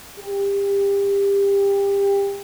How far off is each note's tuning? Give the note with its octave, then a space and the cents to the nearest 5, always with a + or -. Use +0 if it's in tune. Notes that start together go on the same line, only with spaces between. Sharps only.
G4 +25